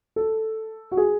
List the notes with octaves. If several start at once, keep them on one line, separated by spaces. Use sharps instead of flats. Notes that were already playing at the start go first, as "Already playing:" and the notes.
A4
F#4
G#4